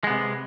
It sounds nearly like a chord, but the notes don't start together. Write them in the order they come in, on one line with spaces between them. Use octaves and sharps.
G#3 B3 C3